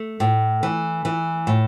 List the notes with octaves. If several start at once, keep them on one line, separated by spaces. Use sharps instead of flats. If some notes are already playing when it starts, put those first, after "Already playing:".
Already playing: A3
A2
E3
E3
A2